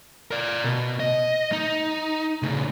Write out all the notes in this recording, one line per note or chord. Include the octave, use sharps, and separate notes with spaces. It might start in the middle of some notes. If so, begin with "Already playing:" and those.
A#4 D5
B2
D#5
D#4
C#3 A3